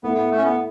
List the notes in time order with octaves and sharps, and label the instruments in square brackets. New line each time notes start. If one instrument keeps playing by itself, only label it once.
[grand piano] A2 A3 E4 [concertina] B3
[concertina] B3
A3
C#4
B3